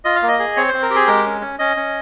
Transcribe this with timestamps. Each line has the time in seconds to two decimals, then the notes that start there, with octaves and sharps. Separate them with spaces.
0.05 F4 D#5
0.16 F5
0.22 A#3
0.28 D#5
0.39 G#4
0.56 C4 C#5
0.69 C5
0.74 C4
0.82 A#4
0.90 G4
0.95 G#4
1.07 G#3 A#4
1.25 C#4
1.41 C#4
1.59 C#4 D#5
1.77 C#4